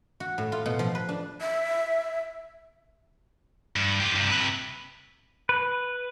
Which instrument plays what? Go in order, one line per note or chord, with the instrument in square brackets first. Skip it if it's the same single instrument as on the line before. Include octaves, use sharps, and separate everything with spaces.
[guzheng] F#4
A2
F4
B2
F3
B4
D4
[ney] E5
[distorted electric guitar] G2
F4 G4
G2 C3
C3 B4
[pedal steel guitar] B4